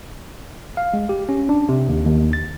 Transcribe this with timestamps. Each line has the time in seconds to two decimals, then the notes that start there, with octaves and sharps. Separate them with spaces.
0.77 F5
0.94 G#3
1.09 G4
1.29 C#4
1.49 D4
1.69 C3
1.89 D#2
2.06 D#2
2.33 A6